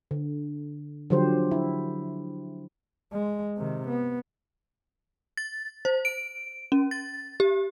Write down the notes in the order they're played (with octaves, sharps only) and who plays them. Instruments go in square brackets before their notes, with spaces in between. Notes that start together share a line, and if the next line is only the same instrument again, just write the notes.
[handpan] D3
D3 F3 F#3 G4 C5
E4
[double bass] G#3
C3 D#3
B3
[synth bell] A6
C5
D7
C#4
A6
G4